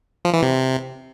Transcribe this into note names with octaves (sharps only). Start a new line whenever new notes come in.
F3
E3
C3